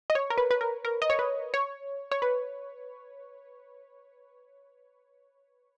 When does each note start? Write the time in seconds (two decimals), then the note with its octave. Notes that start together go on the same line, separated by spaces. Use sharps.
0.10 D#5
0.15 C#5
0.30 A#4
0.38 B4
0.51 B4
0.61 A#4
0.85 A#4
1.02 D#5
1.10 C#5
1.19 B4
1.54 C#5
2.12 C#5
2.22 B4